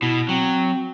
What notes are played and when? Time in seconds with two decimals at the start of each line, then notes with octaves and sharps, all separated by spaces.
0.02 B2 E4
0.29 F#3 C4